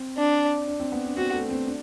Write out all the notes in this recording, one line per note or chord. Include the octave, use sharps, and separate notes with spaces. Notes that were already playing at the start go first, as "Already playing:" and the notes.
Already playing: C4
D4
D4
C4
B3
D4
C4 F#4
A3
C4
D4